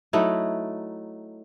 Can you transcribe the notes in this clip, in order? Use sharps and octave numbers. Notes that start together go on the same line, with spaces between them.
F#3 A3 D#4 E4